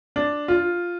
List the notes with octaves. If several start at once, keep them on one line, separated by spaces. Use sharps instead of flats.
D4
F4